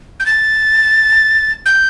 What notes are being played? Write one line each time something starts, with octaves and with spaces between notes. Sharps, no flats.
G6
A6
G6